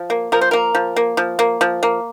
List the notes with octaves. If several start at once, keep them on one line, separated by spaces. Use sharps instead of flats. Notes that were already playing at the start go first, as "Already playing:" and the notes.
Already playing: F3
A#3
F3 A#4
C5
A#3 A#4
F3
A#3
F3
A#3
F3
A#3